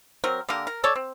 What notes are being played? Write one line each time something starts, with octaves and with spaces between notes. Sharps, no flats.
F#3 C4 A#4
D3 A#3 G4 A#4
A#4
A4 C#5 D5
C4